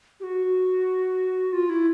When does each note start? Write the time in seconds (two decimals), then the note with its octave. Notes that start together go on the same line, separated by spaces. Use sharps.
0.20 G4
0.23 F#4
1.53 F4
1.69 E4